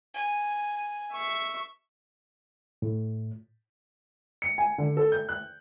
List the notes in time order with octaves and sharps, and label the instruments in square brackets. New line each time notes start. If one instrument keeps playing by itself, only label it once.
[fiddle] G#5
[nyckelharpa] E5 C#6
[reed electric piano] A2
[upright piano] C#7
G#5
D3
A4
G6
F#6